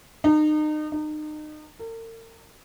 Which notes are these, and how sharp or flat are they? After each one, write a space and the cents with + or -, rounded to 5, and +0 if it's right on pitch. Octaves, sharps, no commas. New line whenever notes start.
D#4 -35
D#4 -35
A#4 -45